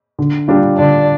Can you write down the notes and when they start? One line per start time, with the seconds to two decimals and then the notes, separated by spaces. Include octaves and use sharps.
0.19 D3
0.48 G3 D4 F4
0.78 D3 D4